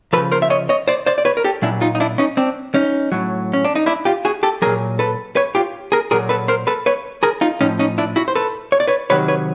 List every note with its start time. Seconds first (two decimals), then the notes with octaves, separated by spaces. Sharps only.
0.13 F3 A4 B4
0.17 C#3
0.32 A#4 C5
0.42 E5
0.50 C#5 D#5
0.69 C#5 D#5
0.88 C5 D5
1.06 C5 D5
1.18 D5
1.25 B4 C#5
1.37 A#4
1.44 G4 A4
1.62 A#2 F#3 D4 E4
1.81 D#4 F4
1.95 D#4
2.00 D4 E4
2.18 C#4 D#4
2.37 C4 D4
2.74 C#4 D#4
3.12 A2 F#3
3.53 C#4
3.65 D4
3.75 D#4
3.86 D4 E4
4.05 F4 G4
4.25 F#4 G#4
4.43 G4 A4
4.62 A#2 F#3 G#4 A#4
4.99 A4 B4
5.36 B4 C#5
5.55 F4 G4
5.92 G#4 A#4
6.11 A#2 F#3 G#4 A#4
6.29 A4 B4
6.48 A#4 C5
6.67 A4 B4
6.86 B4 C#5
7.23 G#4 A#4
7.41 D#4 F4
7.61 A2 F3 C#4 D#4
7.79 C#4 D#4
7.98 D4 E4
8.16 E4 F#4
8.28 C5
8.35 A4 B4
8.72 C#5
8.80 D5
8.87 B4 C#5
9.10 C3 D#3 F#3 B4 C#5
9.28 B4 C#5